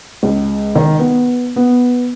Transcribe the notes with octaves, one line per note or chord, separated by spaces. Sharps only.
C#2
D#3
B3
B3